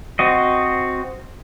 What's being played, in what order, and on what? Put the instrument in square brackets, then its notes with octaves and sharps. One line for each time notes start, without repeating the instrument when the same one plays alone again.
[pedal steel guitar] C4 F#4 D#5